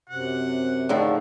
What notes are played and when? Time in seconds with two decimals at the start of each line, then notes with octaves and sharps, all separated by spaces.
0.10 F#2 C3 F#5
0.89 A2 D3 D#3 F3 A3 A4